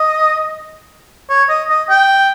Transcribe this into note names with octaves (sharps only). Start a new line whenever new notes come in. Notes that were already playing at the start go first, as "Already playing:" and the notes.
Already playing: D#5
C#5
D#5
D#5
G5